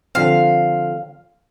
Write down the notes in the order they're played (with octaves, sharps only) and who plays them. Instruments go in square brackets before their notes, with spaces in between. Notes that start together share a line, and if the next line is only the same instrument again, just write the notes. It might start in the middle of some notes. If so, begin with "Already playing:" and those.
[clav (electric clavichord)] D3 F3 C4 [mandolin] F5